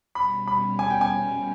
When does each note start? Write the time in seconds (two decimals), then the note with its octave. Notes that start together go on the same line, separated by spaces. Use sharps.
0.14 B2 G3 C#4 B5
0.48 B5
0.79 G#5
0.90 G5
1.01 G#5